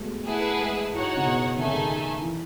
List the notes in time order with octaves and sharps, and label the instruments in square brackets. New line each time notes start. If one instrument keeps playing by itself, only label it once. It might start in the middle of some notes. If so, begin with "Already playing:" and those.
Already playing: [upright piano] F#3 G#3 A3 B3
[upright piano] A3 [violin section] E4 G#4 B4 F#5 A5
[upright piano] G#3
[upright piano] A2 [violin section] D#4 F#4 C#5 F#5
[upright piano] C#3
B2
[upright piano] D#3 [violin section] A3 D#4 A4 E5 G#5
[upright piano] C#3
D#3
E3